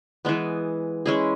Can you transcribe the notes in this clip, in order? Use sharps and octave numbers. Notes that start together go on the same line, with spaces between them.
E3 G#3 B3
G#3 C#4 E4 G#4